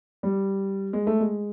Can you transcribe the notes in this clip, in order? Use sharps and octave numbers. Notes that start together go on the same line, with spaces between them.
G3
G#3
A3
G#3